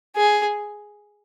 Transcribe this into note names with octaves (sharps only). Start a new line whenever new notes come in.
G#4